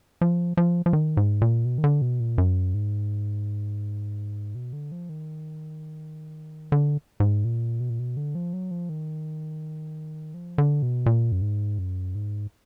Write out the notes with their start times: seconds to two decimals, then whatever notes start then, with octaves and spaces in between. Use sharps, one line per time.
0.21 F3
0.57 F3
0.86 F3
0.93 D#3
1.17 G#2
1.42 A#2
1.65 B2
1.78 D#3
1.84 D3
2.02 B2
2.20 A#2
2.38 F#2
2.74 G#2
4.55 B2
4.73 D3
4.92 F3
5.09 D#3
6.72 D3
7.20 G#2
7.45 A#2
7.80 B2
7.90 A#2
7.99 B2
8.17 D3
8.35 F3
8.53 F#3
8.71 F3
8.89 D#3
10.34 F3
10.58 D3
10.82 B2
11.06 A#2
11.32 F#2
11.42 G#2
11.79 F#2
12.15 G#2